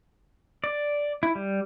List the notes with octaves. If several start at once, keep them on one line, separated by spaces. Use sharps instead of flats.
D5
E4
G3